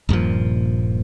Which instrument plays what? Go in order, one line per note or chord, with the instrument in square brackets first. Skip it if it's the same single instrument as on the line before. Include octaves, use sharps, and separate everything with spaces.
[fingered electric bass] D#1 G2 A#2 F3